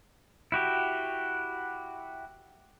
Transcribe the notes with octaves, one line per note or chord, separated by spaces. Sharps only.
E4 F#4 G4